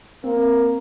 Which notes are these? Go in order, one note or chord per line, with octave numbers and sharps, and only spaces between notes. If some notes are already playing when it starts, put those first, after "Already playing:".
A#3 C4